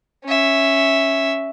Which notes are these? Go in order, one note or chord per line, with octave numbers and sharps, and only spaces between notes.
C#4 E5